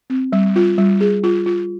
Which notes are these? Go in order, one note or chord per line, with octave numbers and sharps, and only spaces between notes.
C4
G3
F4
G3
G#4
F4
F4